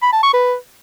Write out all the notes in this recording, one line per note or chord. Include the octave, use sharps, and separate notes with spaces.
B5
A5
C#6
B4